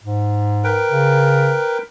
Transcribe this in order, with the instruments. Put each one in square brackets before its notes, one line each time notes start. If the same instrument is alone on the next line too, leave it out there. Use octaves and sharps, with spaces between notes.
[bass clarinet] G#2
[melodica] A#4 B4 G5
[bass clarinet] C#3